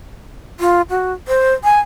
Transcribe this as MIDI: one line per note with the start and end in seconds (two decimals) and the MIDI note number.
0.60 0.81 65
0.90 1.13 66
1.28 1.53 72
1.64 1.80 80